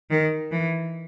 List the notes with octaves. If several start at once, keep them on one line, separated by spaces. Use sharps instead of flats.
D#3
E3